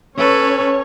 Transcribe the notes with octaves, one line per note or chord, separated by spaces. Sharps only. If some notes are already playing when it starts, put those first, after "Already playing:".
C#4 A4 B4 C#5